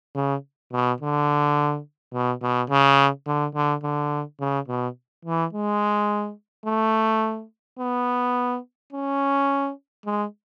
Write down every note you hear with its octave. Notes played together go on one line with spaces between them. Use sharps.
C#3
B2
D3
B2
B2
C#3
D3
D3
D3
C#3
B2
E3
G#3
A3
B3
C#4
G#3